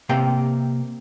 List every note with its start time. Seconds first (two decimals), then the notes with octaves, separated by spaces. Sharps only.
0.09 C3 A#3 G5 A#5 C6